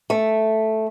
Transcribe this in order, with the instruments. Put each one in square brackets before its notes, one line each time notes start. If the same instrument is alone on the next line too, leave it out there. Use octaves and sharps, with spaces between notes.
[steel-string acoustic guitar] A3